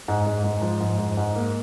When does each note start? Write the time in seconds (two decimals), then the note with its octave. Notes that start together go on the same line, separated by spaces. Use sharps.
0.08 G#2
0.26 G#2
0.44 G#2
0.61 F3
0.80 G#2
0.98 G#2
1.17 G#2
1.35 A#3